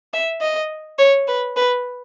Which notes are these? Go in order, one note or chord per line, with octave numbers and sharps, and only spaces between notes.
E5
D#5
C#5
B4
B4